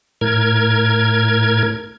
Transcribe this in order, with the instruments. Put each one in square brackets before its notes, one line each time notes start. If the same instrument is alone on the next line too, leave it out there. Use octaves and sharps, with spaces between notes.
[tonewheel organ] A2 A#4 G#6